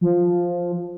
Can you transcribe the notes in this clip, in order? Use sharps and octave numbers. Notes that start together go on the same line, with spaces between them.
F3